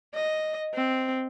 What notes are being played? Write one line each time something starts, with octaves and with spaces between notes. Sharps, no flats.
D#5
C4